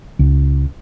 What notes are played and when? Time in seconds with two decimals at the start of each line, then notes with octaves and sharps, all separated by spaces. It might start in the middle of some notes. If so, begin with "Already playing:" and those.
0.19 C#2